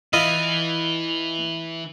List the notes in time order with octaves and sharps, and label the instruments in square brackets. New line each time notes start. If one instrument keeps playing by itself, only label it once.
[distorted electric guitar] E3 [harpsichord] E4 F4 D#5